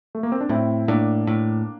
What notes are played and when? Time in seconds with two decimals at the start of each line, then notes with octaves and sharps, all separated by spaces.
0.15 A3
0.23 A#3
0.32 C4
0.41 D4
0.49 A2 C4 E4
0.88 A2 A#3 D4
1.27 A2